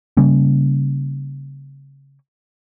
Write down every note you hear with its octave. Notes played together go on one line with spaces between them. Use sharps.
C#3 G3 A#3 C#4